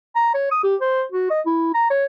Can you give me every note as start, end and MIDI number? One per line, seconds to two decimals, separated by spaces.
0.16 0.31 82
0.34 0.51 73
0.51 0.60 87
0.63 0.76 67
0.81 1.03 72
1.12 1.28 66
1.30 1.41 75
1.46 1.70 64
1.74 1.90 82
1.90 2.05 73